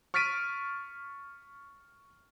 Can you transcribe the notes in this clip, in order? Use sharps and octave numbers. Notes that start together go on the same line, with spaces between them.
C#6 F6 A6 B6 D7 D#7